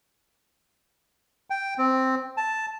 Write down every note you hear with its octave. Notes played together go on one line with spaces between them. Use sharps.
G5
C4
A5